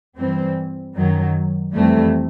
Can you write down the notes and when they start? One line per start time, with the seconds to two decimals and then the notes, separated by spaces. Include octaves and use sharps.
0.17 G2 E3 G3 C4
0.96 F#2 D#3 F#3
1.74 F2 C3 E3 G3 A3